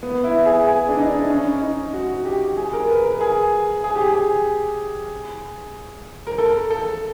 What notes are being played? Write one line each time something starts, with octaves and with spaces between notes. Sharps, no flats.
B3
E4
G#4
G#4
D4
D#4
D4
C#4
D#4
F#4
G4
G#4
A#4
B4
A#4
G#4
G#4
G4
G#4
A#4
A4
A4